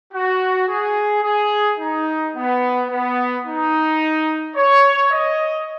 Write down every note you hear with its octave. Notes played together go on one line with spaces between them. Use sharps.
F#4
G#4
G#4
D#4
B3
B3
D#4
C#5
D#5